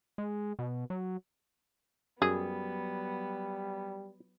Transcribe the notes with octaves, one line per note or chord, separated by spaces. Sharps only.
G#3
B2
F#3
F#2 F#3 G3 B3 G#4